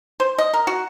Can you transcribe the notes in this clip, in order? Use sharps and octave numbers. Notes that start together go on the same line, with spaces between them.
C5
D#5
A#4
F#4